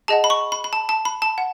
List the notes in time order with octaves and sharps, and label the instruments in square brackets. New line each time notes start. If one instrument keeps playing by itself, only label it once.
[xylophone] G#4 D#5 F#5 A5
B5
C#6
B5
B5
A5
A5
B5
A5
F#5